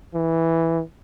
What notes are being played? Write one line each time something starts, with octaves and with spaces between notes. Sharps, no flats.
E3